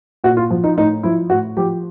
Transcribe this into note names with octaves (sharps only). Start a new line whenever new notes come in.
A#2 F#4
F4
F3
D#4
A2 D#4
F3 E4
A2 F#4
F3 G4